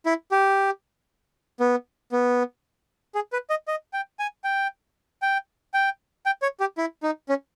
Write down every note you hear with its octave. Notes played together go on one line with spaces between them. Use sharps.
E4
G4
B3
B3
G#4
B4
D#5
D#5
G5
G#5
G5
G5
G5
G5
C#5
G4
E4
D#4
C#4